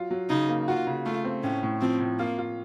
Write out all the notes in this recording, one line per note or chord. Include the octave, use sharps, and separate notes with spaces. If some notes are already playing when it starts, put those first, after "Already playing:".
Already playing: F#3 F4
F#3
C#3 D#4
A#3
F4 F#4
C#3
A3 F4
C4
A2 C#4
A2
F3 C4
A2
A#3 F4
F4